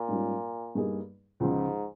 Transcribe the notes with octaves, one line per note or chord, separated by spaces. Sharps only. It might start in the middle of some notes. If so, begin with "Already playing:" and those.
Already playing: A#2
G#2 G3 C#4 F4
G2 G3 A#3 D#4 G#4
C#2 G#2 C#3 F3